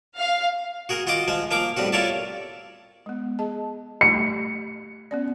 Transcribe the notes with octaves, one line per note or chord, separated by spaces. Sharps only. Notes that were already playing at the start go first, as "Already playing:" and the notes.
F5
F#4 G#4 A#4
F4 F#4 D#5 C6 D6
F3 G#3 C5
F3 A#3 F5 D6
A2 G3 C4 F#4
F4 A#4 C#5 D5 E5 A5
G#3 B3
G#4 D#5 A5
A3 G4 C#6 C#7
B3 C#4 D5